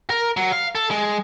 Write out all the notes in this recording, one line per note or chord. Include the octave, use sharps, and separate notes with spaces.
A#4
F#3
F5
A4
G#3